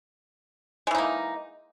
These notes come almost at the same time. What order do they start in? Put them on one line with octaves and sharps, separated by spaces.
G#3 E3 D#4 A#3